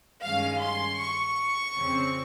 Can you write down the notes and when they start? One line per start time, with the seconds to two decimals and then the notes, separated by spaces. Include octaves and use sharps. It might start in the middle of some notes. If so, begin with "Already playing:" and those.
0.23 G2 D#3 G#3 C#4 F5
0.62 C6
1.00 C#6
1.77 F2 C#3 F3 C4